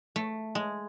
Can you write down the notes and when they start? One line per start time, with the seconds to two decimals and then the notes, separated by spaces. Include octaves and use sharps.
0.16 A3
0.55 G#3